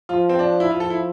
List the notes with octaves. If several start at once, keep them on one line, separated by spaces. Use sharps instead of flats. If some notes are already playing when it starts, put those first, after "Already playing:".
F3 F4
C4
D4
E4
F3 F4
A4
E4